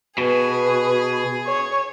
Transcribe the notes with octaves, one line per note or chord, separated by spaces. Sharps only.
B2 G#4 B4
C#5